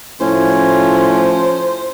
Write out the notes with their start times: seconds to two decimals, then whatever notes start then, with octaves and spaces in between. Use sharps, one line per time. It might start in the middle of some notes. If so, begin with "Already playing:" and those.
0.20 A2 F3 C#4 C5